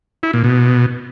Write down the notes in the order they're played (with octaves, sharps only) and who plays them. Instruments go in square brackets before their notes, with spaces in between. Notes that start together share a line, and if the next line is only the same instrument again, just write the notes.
[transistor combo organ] E4
A#2
B2